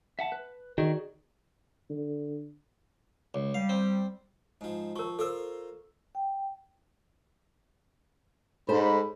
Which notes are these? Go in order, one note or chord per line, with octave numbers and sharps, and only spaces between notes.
E5 F#5 A5
B4
D#3 F#4 G#4 D5
D3
C#2
G3 F5
C4
G#2 F3
F3 A#4 C#6
F4 A4 A#4 C5 E6
G5
G#2 A4 C5 B5